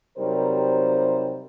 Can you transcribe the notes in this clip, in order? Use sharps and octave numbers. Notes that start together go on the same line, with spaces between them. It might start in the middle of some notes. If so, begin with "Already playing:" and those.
C3 F#3 G3 D#4 A#4 C5